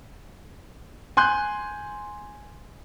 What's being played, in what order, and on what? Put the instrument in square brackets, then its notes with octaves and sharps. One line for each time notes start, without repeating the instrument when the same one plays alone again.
[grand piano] G#5 C6 F#6 G6